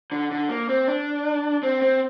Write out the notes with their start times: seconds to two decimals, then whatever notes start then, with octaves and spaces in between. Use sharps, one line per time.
0.12 D3
0.31 D3
0.49 A#3
0.69 C4
0.88 D4
1.63 C4
1.82 C4